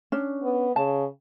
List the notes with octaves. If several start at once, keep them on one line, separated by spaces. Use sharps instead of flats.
C#4 D4
B3
C#3 A5